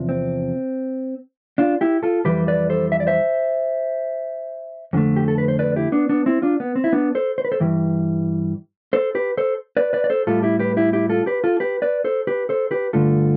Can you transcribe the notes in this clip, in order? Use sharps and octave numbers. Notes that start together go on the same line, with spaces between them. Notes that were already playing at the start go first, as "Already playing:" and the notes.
Already playing: E2 C3 F3
C4
D4 F4
E4 G4
F4 A4
F2 E3 G3 G4 B4
B4 D5
A4 C5
E5
D5
C5 E5
F2 D3 A3
G4
A4
B4
C5
B4 D5
E4 G4
B3 D4
B3 D4
C4 E4
D4 F4
B3
C4
E4
B3 D4
A4 C5
C5
B4
A4 C5
G2 E3 G3
A4 C5
G4 B4
A4 C5
B4 D5
B4 D5
D5
A4 C5
A2 G3 F4 A4
E4 G4
G4 B4
E4 G4
E4 G4
F4 A4
G4 B4
F4 A4
G4 B4
B4 D5
A4 C5
G4 B4
A4 C5
G4 B4
G2 D3 A3 F4 A4